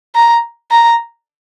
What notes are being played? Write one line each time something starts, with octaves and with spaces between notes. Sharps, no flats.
A#5
A#5